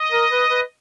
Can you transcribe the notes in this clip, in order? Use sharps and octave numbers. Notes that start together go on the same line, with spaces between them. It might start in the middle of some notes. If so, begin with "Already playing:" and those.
Already playing: D#5
A#4
B4
B4